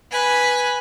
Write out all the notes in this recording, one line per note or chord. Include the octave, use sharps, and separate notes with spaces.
B4 G#5